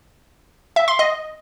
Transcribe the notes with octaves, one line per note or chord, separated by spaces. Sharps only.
E5
C6
D#5